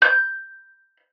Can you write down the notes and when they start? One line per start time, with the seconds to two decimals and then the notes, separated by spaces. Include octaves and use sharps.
0.02 G6